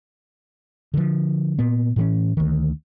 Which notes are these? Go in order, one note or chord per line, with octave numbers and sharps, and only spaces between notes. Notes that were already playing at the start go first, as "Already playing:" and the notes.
D3 F3
A#2 B3
A2 E3 C#4
D2 D#3